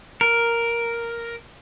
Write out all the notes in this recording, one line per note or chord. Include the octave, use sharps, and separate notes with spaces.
A#4